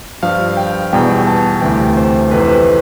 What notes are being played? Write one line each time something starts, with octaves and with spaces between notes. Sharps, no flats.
G2 F3 F5
G5
E2 B2 G3 G5
A5
D2 C3 E3 G5
C5
F2 C3 E3 B4
C5
B4